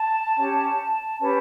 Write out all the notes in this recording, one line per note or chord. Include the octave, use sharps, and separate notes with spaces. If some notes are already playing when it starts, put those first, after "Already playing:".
Already playing: A5
C#4 G4 C#5
C#4 G4 B4 A5